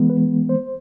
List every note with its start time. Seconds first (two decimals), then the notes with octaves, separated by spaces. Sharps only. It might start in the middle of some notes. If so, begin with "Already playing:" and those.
Already playing: E3 G#3 B3
0.10 B4
0.49 C5